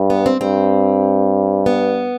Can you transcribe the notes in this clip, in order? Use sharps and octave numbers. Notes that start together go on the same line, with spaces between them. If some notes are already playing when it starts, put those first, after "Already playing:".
Already playing: G2
B3
C4
G2 C4
B3